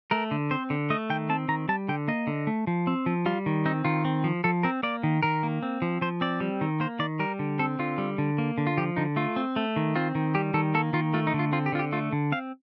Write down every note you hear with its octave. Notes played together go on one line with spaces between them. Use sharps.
A3 A#4
D3
C4 C5
D3
A3 D#5
D#3 G5
C4 A5
D#3 A#5
G3 A5
D3 G5
A#3 D#5
D3
A3
F3
C4
F3
G3 F4
D#3
C4 D#4
D#3 F4
C4
F3
F3 A4
C4 A#4
A#3 D5
D#3
D#3 A#4
A#3
C4
F3
F3 C5
C4 D5
G3
D#3
A#3 C5
D#3 D5
G3 A#4
D3
C4 A4
D3 F4
G3
D3
A#3
D3
F4
F3 G4
D3 D#4
A3 F4
C4
A3
D#3
C4 F4
D#3
G3 G4
D#3 A4
A#3 A4
D#3 F4
A3 F4
D#4
D3
F4
C4 F4
G4
D3 F4
G4
A3 F4
D3
C4 F5